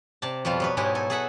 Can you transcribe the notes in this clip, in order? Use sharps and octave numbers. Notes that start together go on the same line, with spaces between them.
C3 D5 A5
F2 B2 F3 G3 F4
F#3 B3 B4
G#2 F#3 G#3 E4 G4 G#5
A4 G#5
G#4 A4 E5 F#5 G#5